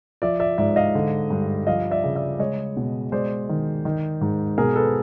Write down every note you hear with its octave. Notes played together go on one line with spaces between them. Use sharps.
F3 D5 E5
D5 E5
G#2 D5 E5
D#5 F5
D3
G2
F3 D#5 F5
D5 E5
C#3
D5 E5
G#3 C#5 D#5
B2
G#3 C5 D5
D#3
D#3
G#2
B2 G#4 A#4
A4 B4